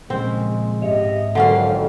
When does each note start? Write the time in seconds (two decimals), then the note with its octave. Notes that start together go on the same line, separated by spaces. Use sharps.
0.10 A#2 C#3 F3 G#3 C4
0.82 G#2 G4 C#5 D#5 E5
1.35 G#1 F2 D3 F#3 C#4 F5